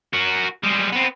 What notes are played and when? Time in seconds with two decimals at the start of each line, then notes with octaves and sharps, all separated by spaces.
0.13 F#4 A#4
0.63 G3 G#3
0.92 B3 C4